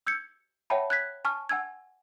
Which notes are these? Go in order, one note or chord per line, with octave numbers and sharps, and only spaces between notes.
E6 G6 G#6 C#7
C#5 E5 F#5 G5 A5 B5
F#6 G#6 B6
G#5 A5 C#6 F6
F#5 G#5 E6 G#6